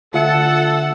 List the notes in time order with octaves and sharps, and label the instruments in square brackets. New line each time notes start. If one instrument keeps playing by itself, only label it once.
[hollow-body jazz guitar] D2 [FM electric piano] F4 E5 C#7 [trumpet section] A4 [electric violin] F#5